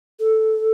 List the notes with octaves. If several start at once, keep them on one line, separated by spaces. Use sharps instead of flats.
A4